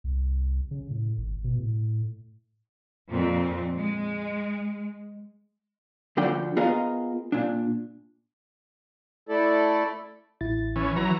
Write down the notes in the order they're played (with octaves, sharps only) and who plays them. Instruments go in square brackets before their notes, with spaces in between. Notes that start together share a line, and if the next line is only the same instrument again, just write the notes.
[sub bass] C2
C#3
A2
G#1
B2
A2
[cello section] F2 A#2 C4
G#3
[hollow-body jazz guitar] D2 D3 F3 D4 G5
B3 F4 G#4 A#4 D#5 F5
A#2 D4
[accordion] A3 E4 A4 D5
[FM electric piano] A1 E4 A6
[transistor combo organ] E3 C#4
E3 F#3 A#5